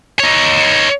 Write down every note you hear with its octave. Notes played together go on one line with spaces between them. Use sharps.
D#4 C#5